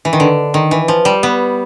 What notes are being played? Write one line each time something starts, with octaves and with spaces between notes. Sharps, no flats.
E3
D#3
D3
D#3
E3
F3
G3
B3